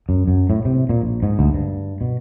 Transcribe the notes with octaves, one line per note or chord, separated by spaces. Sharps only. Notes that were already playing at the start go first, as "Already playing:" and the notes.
F#2
F#2
A2
C3
A#2
A#1
G#2
D2
G2
B2